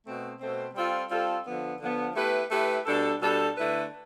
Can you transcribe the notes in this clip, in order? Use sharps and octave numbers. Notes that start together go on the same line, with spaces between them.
B2 A3 C4
B2 A3 C4
G3 C4 F4 A4
G3 C4 F4 A4
D3 F3 B3
D3 F3 B3
A3 E4 G4 B4
A3 E4 G4 B4
B2 G3 D4 A4
B2 G3 D4 A4
D3 A3 E4 B4